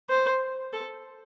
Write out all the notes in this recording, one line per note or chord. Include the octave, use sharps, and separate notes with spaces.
C5
A4